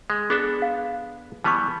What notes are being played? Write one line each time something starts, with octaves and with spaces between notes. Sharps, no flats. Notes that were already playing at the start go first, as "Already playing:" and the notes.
G#3
B3 D4 G#4 A4
F5
E3 G3 B3 A5 B5 C#6